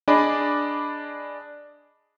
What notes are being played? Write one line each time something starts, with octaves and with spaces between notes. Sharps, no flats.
D4 G#4 D5 D#5 B5